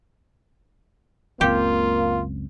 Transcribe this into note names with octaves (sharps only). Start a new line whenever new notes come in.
F#1 C#2 A#3 C4 F4 G4